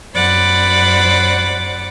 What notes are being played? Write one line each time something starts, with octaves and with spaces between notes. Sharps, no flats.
F#2 C5 D5 F#5 B5 D6